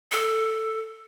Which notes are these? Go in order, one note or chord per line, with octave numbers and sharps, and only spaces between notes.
A4